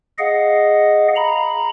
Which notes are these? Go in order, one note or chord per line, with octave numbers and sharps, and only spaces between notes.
G#4 D#5 F5 F#5
A#5 B5